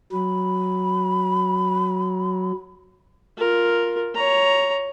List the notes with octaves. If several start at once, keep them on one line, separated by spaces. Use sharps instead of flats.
F#3 B5
F4 A#4
C#5 A#5